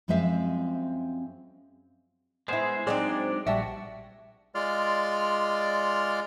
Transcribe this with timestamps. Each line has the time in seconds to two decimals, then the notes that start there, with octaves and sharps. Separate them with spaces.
0.08 F#2 F3 G#3 C4 E5 F5
2.48 G#3 B3 E4 G#4 C5
2.87 F#3 G#3 C4 D4 D#4 G#4 C5 D5
3.47 A#1 G3 F#4 E5 A5
4.55 G#3 F4 D5 C6 F6